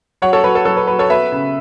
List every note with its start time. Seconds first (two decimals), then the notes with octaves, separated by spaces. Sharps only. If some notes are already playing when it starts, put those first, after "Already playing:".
0.22 F#3 C#5 F#5
0.33 A4 C#5
0.44 F#3 B4
0.55 A4
0.65 F#3 A4
0.77 B4
0.87 F#3 B4
0.99 A4 C#5
1.10 B3 B4 E5
1.32 C#3